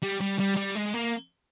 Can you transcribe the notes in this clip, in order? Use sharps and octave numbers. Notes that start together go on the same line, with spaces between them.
G3
G3
G3
G3
G#3
A#3